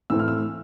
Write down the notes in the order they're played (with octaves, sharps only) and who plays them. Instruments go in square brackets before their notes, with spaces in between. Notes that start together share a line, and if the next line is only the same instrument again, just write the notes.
[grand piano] A2 E3 A3 C4 E6
F6
E6